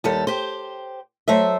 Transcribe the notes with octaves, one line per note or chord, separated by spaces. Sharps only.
D#2 G3 A4
G4 C5
F#3 A3 C5 E5